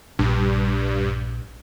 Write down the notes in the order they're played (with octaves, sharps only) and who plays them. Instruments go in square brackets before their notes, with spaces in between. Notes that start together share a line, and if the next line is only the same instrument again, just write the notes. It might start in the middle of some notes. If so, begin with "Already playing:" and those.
[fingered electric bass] A#1 [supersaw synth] G2